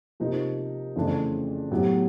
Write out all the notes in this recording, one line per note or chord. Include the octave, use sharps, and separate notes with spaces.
C3 F3 A#3 D#4
F2 C#3 E3 A3 D4
A2 F#3 B3 E4 G4